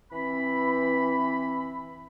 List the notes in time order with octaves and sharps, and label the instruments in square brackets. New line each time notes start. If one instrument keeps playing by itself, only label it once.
[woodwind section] E3 C4 B5